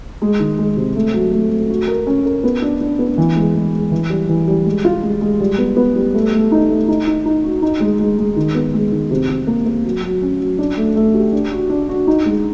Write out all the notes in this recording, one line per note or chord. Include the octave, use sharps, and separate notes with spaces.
G#3
D#3
G#3
C3
A3
F#3
A3
A3
F#4
A#4
C#4
A#4
B3
D4
D4
B3
E3
G#3
G#3
G#3
E3
G3
E3
G3
G#3
F4
G#3
G#3
G3
B3
B3
G3
A3
A3
D#4
A3
D#4
D#4
D#4
F#4
D#4
G#3
G#3
G#3
D#3
B3
G#3
D#3
C3
C3
A#3
A#3
F#3
F#3
C#4
F#3
D4
A3
A3
G4
D4
F#4
D4
F#4
D#4
G#3